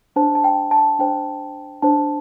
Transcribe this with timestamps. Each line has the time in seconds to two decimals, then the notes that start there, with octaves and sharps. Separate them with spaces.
0.16 D4 C5 A5
0.35 A5
0.44 G5
0.71 A5
0.99 D4 C5 G5
1.82 D4 C5 A5